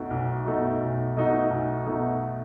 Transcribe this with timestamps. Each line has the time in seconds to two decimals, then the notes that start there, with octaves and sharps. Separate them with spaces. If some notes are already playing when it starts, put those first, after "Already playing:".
Already playing: B1 B2 A3 D#4 F#4
0.10 B1
0.45 B2 A3 D#4 F#4
0.80 B1
1.16 B2 A3 D#4 F#4
1.50 B1
1.86 B2 A3 D#4 F#4